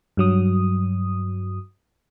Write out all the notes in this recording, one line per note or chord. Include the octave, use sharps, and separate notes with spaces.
G2 F#3 D#6